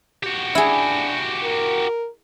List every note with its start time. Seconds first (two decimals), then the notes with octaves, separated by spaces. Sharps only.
0.23 F#4 G4
0.55 D4 E4 G#4
1.44 A#4